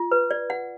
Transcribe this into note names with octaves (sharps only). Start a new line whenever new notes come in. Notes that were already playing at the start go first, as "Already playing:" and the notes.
Already playing: F4
B4
D5
F#5